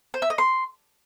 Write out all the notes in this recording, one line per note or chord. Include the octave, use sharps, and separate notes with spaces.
C5
E5
D#5
C6